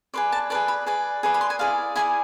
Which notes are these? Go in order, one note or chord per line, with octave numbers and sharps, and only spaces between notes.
G#4 B4 D5 C6
A5
G#4 B4 D5 A5
B5
G#4 B4 D5
G#4 B4 D5
B5
C6
G#5
E4 G#4 D5 F5
E4 G#4 D5 G#5